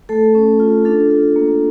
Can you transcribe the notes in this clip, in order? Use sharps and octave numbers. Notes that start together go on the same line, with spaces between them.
A3 A4
C#4
F4
D4 A4
F4
A#3